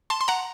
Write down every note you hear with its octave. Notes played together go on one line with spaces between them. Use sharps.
A5 C6
C6
F#5 A#5